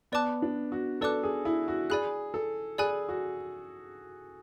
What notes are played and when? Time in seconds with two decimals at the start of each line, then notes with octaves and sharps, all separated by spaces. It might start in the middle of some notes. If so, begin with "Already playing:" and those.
0.12 B3 B4 D5 A5 D6 F#6
0.42 D4
0.72 F#4
1.01 A4 B4 D5 A5 D6 F#6
1.23 G#4
1.45 E4
1.68 F#4
1.90 G#4 D5 G#5 B5 F#6
2.34 A4
2.78 G#4 D5 G#5 B5 F#6
3.09 F#4